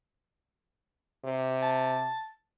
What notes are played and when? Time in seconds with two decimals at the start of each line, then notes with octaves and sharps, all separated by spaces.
1.24 C3
1.62 A5